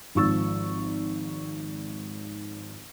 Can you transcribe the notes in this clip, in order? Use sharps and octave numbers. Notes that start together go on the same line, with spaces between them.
G#1 G#2 F3 C#6 E6 A6